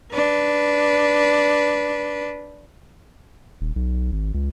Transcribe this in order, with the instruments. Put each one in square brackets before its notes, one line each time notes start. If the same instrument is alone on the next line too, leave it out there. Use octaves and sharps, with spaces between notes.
[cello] D4 B4
[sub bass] D#1
B1
G#1
C#2